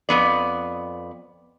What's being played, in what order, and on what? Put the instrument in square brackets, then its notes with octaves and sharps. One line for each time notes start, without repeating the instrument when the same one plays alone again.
[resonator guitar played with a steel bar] F2 G#2 B3 D5